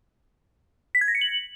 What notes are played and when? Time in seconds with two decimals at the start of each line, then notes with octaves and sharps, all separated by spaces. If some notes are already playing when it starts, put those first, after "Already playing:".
0.95 B6
1.01 G#6
1.08 A#6
1.15 C#7
1.21 F#7